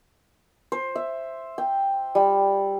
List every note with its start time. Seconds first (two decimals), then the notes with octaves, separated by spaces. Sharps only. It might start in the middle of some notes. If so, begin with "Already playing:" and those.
0.72 C5
0.95 E5
1.58 G5
2.15 G3